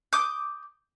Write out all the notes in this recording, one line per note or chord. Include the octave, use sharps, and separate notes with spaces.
D6 D#6 G6